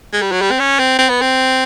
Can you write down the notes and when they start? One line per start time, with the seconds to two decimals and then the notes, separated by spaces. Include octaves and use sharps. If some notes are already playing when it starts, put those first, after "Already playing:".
0.13 G#3
0.22 G3
0.32 F#3
0.42 G3
0.51 C4
0.60 C#4
0.79 C4
0.99 C4
1.10 B3
1.21 C4